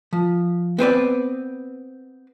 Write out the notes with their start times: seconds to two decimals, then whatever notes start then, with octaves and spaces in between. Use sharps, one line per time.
0.13 F3
0.78 B3 C4 B4 D5